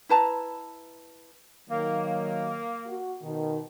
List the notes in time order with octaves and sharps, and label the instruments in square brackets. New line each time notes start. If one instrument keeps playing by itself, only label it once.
[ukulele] E4 B4 A5 A#5
[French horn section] D#3 F#3 [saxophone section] A#3
[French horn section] F#4
B2 D#3